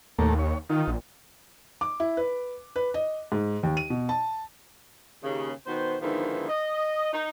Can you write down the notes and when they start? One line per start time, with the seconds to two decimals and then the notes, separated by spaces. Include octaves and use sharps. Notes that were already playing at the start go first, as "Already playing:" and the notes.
0.19 D#2 A2 A3 A#3
0.39 C#5
0.70 D#3 D#4 F4
0.88 A#1
1.81 D6
2.00 E4
2.17 B4
2.76 B4
2.94 D#5
3.32 G#2
3.63 D#2
3.77 D#7
3.90 B2
4.09 A5
5.24 D#2 C#3
5.67 B2 D#3 B3 C5
6.01 G#2 D3 D#3 F3 B3 E4
6.49 D#5
7.12 D#4